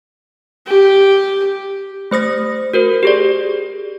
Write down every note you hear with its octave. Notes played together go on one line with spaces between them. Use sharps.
G4
A3 C5 D#6 A#6
F#4 A#4 C5
G4 G#4 D5